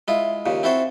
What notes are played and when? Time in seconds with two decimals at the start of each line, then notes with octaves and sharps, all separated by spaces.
0.08 G#3 E4 F4
0.46 D#2 A#2 C#3
0.63 C4 E4 F#4 A4 C5 C#5